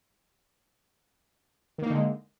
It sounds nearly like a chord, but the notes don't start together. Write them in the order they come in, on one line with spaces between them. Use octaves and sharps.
D#3 A#3 D#4 D3 G#3